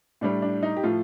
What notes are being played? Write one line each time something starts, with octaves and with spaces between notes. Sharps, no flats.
A2 G3 D4
D4
D#4
G4
A2 F3 F4